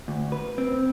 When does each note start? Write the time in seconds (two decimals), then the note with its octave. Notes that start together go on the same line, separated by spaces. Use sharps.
0.08 D2
0.32 B4
0.58 C4